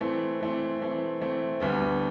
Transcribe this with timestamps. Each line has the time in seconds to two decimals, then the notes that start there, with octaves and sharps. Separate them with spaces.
0.01 E3 A3 C4
0.40 E3 A3 C4
0.81 E3 A3 C4
1.21 E3 A3 C4
1.60 D2 D3 G3 B3